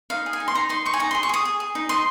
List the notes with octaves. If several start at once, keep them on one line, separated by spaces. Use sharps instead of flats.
D#4 F5
G#4
G#5
D#4
C6
D#4 A#5
D#4 C6
D#4 C#6
G#5
D#4 A#5
G#4 C6
C#6
G#4 D#6
G#4
G#4
D#4
D#5 C6